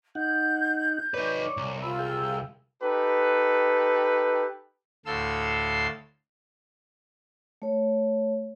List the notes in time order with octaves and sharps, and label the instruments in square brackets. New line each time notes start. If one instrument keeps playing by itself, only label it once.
[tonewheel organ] D#4 F#5 [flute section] G6
[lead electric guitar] D#4 B4 [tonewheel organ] C#5 D5
[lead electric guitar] C2
[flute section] F4 E6 [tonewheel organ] B5
[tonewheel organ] G#4 F5 G5
[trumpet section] D#4 G4 A4 B4
[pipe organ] D2 A2 A4 F5 C6 E6
[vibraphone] A3 C#5